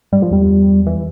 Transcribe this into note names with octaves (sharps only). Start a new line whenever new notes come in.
G2 G3
F3
E2 G3
E3